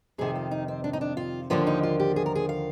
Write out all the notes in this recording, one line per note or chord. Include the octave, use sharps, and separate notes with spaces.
F2 C3 D#3 G#4
F4
D#4
C4
D4
D#4
D4
F4
D#2 D3 F3 A#3 F4
D#4
F4
G4
G#4
A#4
G#4
F5